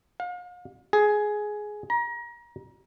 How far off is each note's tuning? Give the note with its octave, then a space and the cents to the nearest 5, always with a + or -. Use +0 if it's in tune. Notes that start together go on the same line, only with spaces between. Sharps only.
F5 +40
G#4 +10
A#5 +30